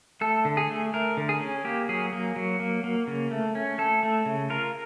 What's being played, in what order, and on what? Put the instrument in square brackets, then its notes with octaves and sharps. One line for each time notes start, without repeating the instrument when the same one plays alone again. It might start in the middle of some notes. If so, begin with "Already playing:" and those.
[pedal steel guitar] A3 A4
D3
G#4
A3
A3 A#4
D3
G#4
C#4
A#3 G4
F#3 G#4
A#3
F#3
A#3
A#3
C#3
A3
C#4
A3 A4
A3
C#3
F4 A#4